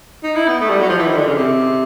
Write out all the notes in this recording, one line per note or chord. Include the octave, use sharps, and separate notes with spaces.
D#4
E4
B3
A3
G3
F#3
F3
E3
D#3
D3
C#3
C3